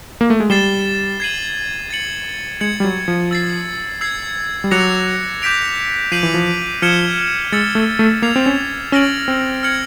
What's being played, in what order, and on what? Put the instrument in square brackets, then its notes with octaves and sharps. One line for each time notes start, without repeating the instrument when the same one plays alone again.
[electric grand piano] A#3
A3
G#3
[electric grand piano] G3 [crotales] A6 C7 E7 G7
[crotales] G#6 C7 D#7 F#7
A6 C#7 F#7
[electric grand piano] G#3 [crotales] G#6 C#7 F#7
[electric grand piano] G3
F#3
F3
[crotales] E6 A6 C7
E6 G#6 C7
[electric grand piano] G3
[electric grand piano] F#3 [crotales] D6 F#6 A#6 C#7 F7
[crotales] D6 G6 B6 D7 F7
[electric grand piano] F3 [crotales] G6 C7 D#7 F#7
[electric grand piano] E3
F3
[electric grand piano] F3 [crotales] F6 G#6 C#7 E7 G7
[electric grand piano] G#3 [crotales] E6 A6 C#7
[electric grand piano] A3
A3
[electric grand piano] A#3 [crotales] G#6 C7 F7
[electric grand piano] C4
C#4
[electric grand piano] C#4 [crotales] F6 A#6 D7 F#7
[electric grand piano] C4
[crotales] F6 G#6 C#7 F#7